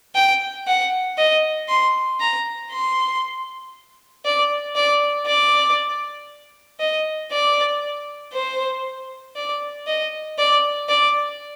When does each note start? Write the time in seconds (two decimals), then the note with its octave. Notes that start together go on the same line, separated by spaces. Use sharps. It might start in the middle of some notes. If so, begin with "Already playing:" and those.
0.15 G5
0.67 F#5
1.18 D#5
1.68 C6
2.20 A#5
2.71 C6
4.25 D5
4.76 D5
5.26 D5
6.80 D#5
7.32 D5
8.33 C5
9.36 D5
9.87 D#5
10.38 D5
10.89 D5